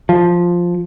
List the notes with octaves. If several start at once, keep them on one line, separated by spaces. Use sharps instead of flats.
F3